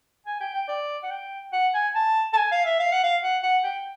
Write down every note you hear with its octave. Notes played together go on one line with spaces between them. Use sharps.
G#5
G5
G5
D5
F#5
G5
F#5
G#5
A5
A5
G#5
F5
E5
F5
F#5
F5
F#5
F#5
G5